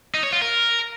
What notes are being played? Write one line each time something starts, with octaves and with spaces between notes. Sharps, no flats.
D#4
C#5
F4
A#4